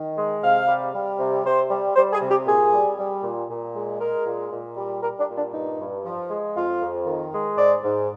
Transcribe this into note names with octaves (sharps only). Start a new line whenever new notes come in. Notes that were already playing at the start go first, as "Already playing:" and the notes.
Already playing: D#3
G#3
C3 F5
G3
G3
C3
C3 C5
G3
G3 C5
G#4
C3
G4
A#2 G#4
G3
G3
A#2
A#2
G#3
G#3 A#4
A#2
A#2
G3
G3 A#4
D4
A#2
D4
G2 D#4
G2
F3
G#3
F2 F4
F2
D#3
G#3
G#2 D5
G#2